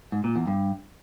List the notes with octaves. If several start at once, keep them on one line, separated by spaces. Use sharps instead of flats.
G#2
A#2
E2
G2